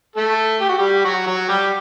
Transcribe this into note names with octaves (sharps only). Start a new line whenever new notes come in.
A3 A4
G4
F#4
G3 G4
F#3 F#4
F#3 F#4
G3 G4